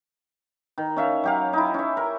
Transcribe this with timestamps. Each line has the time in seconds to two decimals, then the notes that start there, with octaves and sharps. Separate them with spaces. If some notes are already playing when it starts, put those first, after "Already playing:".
0.78 D#3
0.96 C#4 E5 F5
1.24 F#3 G4 F5
1.53 D#4 E4
1.74 C#4 E5
1.97 A#4